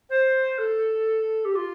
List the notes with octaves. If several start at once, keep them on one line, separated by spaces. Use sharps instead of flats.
C5
A4
G4
F4